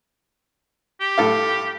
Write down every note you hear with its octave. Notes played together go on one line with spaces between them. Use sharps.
G4
A2 A4 F5